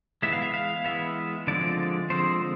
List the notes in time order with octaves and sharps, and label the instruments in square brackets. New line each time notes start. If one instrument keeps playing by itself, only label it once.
[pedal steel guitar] E3 G#3 B3 E5
F5
E5
F5
E3 G#3 B3 E5
D3 F3 G#3 C4 D5
D3 F3 G#3 C4 C5